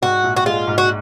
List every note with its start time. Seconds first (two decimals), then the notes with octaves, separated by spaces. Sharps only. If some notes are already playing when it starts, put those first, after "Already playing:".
0.02 G#2 F#4
0.24 A#1
0.36 F#4
0.46 G#3 F4
0.67 G#2
0.78 F#4